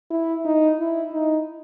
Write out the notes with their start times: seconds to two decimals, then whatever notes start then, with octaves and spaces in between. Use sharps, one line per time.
0.11 E4
0.45 D#4
0.79 E4
1.13 D#4